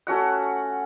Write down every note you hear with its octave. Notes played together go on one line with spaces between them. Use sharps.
A3 C#4 F#4 F#5